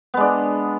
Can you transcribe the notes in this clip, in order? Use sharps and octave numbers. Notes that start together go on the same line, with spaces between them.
G#3 B3 D4